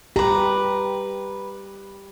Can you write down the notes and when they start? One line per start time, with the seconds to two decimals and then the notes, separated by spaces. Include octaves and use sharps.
0.16 G4 B4 A#5